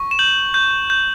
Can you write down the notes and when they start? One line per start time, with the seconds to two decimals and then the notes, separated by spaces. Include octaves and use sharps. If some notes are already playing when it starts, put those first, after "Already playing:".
Already playing: C#6
0.11 E7
0.19 G6 F#7
0.54 G6
0.90 G6